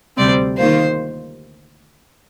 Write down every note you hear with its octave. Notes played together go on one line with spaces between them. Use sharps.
D2 C3 G3 C4 D5
D#3 A#3 F4 C5